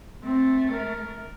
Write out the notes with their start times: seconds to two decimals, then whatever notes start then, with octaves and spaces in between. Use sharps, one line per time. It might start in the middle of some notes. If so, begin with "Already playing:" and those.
0.23 A3 C4
0.71 A#4